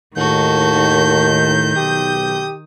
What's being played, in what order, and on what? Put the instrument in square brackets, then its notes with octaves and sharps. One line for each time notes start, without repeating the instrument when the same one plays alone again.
[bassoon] D#2 [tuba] A2 [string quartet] D#3 G6 [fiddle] F#4 A4
[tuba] B1 [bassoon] G4 [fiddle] D#6